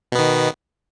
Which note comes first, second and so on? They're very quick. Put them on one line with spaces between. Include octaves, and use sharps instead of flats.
B2 B3 D#3